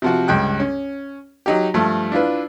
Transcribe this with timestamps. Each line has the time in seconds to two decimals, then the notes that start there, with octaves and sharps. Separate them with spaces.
0.02 C3 F3 F#4
0.28 C#2 G2 G5 F#6
0.60 C#4
1.46 F#3 D#4 G4
1.74 G2 F3 A3
2.12 D4 E4 F4 B4